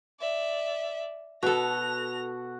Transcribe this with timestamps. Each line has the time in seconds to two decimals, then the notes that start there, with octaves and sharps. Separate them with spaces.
0.19 D5 E5
1.43 B2 F#4 A4 A#6 F7